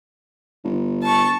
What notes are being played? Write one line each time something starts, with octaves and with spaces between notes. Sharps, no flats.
G1
A5 C#6